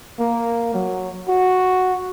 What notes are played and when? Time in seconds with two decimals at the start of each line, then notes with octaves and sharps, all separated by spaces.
0.19 A#3
0.74 F#3
1.28 F#4